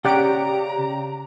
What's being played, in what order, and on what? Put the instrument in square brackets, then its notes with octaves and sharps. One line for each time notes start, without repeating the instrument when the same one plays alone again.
[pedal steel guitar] C#3 F#6 [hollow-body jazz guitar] C#4 D5 F#5 [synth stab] G4 D7 [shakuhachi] A#5